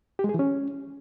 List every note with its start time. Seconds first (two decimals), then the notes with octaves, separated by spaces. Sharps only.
0.19 G4
0.24 G#3
0.29 G#4
0.34 E3
0.39 C#4